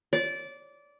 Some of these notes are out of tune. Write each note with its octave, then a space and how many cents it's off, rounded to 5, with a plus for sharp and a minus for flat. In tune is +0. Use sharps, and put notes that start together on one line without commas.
D5 -20